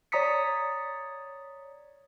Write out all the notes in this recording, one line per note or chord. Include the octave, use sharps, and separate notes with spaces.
C#5 D5 A#5 D#6 B6 C#7